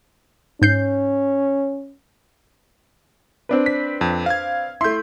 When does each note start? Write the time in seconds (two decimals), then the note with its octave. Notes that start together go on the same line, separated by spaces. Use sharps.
0.62 G#2 C#4 G6 C7
3.49 C4 D4 B4
3.66 B6
4.01 F2
4.26 F5 G#6
4.81 A3 E4 C6 G6